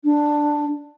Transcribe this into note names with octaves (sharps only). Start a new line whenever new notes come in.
D4